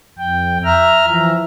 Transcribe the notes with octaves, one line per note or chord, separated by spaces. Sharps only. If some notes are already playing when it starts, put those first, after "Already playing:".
F2 G5
E5 A#5 F6
E3 F3